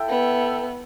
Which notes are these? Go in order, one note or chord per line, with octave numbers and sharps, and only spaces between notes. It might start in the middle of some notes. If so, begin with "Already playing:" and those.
Already playing: E4 A4 E5 G5
B3